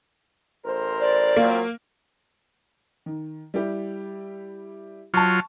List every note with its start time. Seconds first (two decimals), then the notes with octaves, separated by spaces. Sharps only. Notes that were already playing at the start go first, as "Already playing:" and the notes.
0.64 A1 A#4 C5
1.01 D5
1.36 F#3 A#3 C4 F4
3.06 D#3
3.54 G3 E4 G4
5.14 F#3 F4 A5 C#6